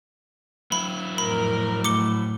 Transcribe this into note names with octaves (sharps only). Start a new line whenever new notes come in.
F#3 E4 B5
F2 A2 A#4 B5
A2 A3 D6 C#7 G7